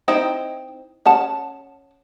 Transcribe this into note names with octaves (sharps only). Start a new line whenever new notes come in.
C4 D#4 E4
C#4 F#5 A5